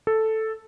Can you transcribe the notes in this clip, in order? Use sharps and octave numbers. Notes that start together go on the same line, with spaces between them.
A4